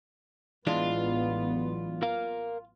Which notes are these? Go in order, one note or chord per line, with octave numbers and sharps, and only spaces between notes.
A1 E3 F#3 G#3 B3 D4 F4
A#4 F5